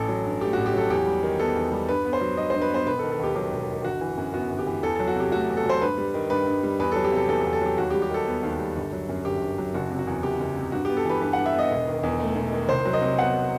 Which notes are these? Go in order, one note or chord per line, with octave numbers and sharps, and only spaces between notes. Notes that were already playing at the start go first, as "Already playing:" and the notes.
Already playing: A1 A4
F#3
G2
A3 G4
F#4
A1
G4
F#3 A4
E2 G4
G3
D#3
B3 A4
E2
G3
G2 B4
B3
C5
F#3
G2 D#5
C5
G2
B4
B3 C5
E1 B4
A4
D#3
A4
D#2 G4
F#3 G4
E1
D#3
G1 F#4
E3
F#2
B3 F#4
G1
G4
E3
E2 A4
A4
F#3
F#4
C3 G4
A3 F#4
E2
A4
F#3 C5
G2 B4
G3
D#3
G2 B4
G2
G3
E2 B4
A4
F#3
G4
C3 A4
E2 A4
A4
E2
A4
F#3 G4
D#2 F#4
G4
G3
G4
D#3 A4
B3
D#2
G3
G1
F#3
F#2
G1 G4
G1
F#3
F#1 F#4
C3
F#4
E2
F#1 G4
F#1
C3
G2 F#4
G4
B3
A4
E3 B4
G2 B4
F#5
G2
E5
B3 D#5
E1
D#3
E2
A3
E1
D#3
C2 C5
F#3
D#5
C3
B3 F#5